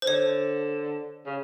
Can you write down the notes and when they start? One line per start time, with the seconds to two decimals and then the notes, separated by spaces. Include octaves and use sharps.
0.02 C5
0.07 D3 C#5
1.26 C#3